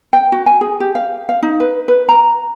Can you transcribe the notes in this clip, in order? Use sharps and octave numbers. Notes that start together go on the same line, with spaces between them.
G5
F#4
G#5
G#4
G4
F5
F5
D#4
B4
B4
A#5